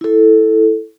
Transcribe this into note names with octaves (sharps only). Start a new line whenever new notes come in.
E4 A4